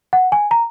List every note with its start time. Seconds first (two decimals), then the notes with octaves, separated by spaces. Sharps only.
0.13 F#5
0.32 G#5
0.51 A#5